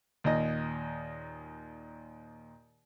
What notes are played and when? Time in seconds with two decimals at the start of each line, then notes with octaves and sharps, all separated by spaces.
0.24 D#2 A#2 D#5